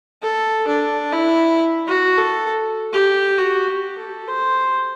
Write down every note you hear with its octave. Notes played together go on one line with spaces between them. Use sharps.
A4
D4
E4
F#4
A4
G4
F#4
G4
A4
C5